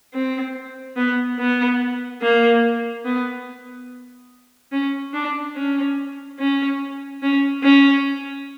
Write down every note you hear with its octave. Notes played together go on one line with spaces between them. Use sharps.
C4
B3
B3
A#3
B3
C#4
D4
C#4
C#4
C#4
C#4